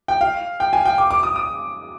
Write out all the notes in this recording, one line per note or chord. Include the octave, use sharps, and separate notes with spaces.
G5
F5
G5
G#5
G5
D6
D6
D#6
D#6